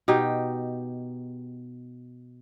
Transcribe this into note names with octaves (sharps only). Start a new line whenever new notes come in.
B2 D#4 G4